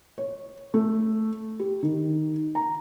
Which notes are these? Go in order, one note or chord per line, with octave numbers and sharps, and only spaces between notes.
C#5
A3
G4
D#3
A#5